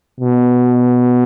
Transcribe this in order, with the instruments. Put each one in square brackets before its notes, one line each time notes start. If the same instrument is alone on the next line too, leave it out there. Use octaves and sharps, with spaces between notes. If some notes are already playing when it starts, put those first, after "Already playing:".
[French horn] B2